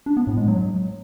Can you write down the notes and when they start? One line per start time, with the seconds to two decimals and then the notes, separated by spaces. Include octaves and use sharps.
0.06 D4
0.17 B3
0.27 A2
0.37 G#3
0.48 F#3